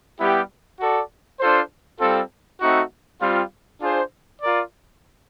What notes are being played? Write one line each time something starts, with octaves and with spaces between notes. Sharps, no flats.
G3 B3 E4 G4
F#4 A4 D5
D4 F4 A4 C5
G3 C4 F4 A4
A3 C4 D#4 F#4
G3 C4 F4
D4 F4 G#4 C5
F4 A#4 D5